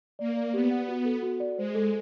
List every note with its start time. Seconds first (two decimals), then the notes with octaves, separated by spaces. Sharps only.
0.19 A#3 D5
0.37 D5
0.54 B3 G4
0.70 F#5
0.88 F#4
1.05 A4
1.23 F#4
1.40 D5
1.57 G#3 C5
1.75 A4